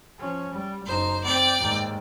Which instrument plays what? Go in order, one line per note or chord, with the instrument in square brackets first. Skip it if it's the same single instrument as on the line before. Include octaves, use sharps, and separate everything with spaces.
[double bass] F3 C#4
G3
[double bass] F#1 D#4 [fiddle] C5
[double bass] C4 [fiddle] D5 G5
[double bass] D#2 G#2